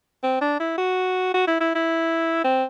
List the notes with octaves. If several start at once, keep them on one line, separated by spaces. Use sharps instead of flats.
C4
D4
E4
F#4
F#4
E4
E4
E4
C4